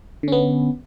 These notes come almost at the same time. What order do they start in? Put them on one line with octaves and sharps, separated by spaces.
D3 C#4 B3